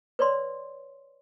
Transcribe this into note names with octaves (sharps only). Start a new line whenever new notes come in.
B4 C#5 D5 C6